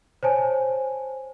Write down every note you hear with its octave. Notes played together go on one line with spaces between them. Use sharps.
C5 C#5 G#5 A5